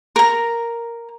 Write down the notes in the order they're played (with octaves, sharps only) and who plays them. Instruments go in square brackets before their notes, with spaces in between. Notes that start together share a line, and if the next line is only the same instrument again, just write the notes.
[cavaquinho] A#4 A#5